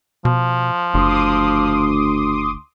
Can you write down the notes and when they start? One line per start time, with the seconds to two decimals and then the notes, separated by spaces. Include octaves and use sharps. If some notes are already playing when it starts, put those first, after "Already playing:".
0.25 B2 F3
0.94 F#1 D2 C6 D6 D#6